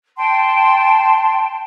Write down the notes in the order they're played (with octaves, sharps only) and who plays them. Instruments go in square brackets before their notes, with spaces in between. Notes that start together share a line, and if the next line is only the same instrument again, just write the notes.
[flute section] G5 A5 C6